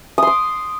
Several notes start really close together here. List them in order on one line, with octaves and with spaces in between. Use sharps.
D#6 C6 D6